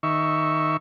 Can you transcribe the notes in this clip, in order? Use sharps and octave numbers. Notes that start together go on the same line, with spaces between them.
D#3 E5 C#6